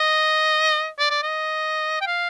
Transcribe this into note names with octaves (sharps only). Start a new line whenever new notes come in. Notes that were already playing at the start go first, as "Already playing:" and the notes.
Already playing: D#5
D5
D5
D#5
G5
F5